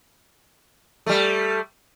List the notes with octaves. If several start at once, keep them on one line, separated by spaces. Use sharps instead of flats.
G3 A3